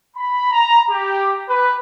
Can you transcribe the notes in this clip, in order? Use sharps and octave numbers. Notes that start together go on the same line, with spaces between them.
B5
A#5
G4
B4